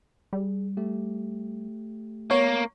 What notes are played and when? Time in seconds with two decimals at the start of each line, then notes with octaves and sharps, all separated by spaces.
0.33 G3 G#4
0.77 A3 G4
2.31 A#3 B3 C#5